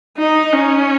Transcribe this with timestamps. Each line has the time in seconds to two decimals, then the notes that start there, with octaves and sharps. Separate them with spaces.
0.18 D#4
0.53 C#4